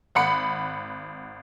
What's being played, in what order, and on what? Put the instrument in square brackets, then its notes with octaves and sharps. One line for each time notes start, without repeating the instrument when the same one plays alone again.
[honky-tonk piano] G#1 F#5 B5 C#7